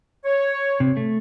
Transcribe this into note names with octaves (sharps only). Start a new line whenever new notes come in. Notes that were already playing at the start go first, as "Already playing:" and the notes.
C#5
C3
A3